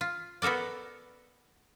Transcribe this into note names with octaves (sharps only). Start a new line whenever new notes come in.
F4
B3 F#4 A4 A#4 D5